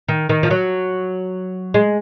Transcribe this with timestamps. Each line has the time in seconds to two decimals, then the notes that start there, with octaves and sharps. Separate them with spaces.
0.08 D#3
0.29 D#3
0.43 F3
0.50 F#3
1.74 G#3